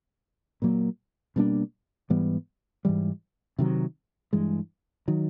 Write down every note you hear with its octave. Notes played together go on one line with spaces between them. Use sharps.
A#2 F#3 A#3
B2 G3 A#3 D4
G#2 E3 G3 B3
G#2 E3 G3
C3 D#3 F#3
G2 E3 G#3
D#3 F#3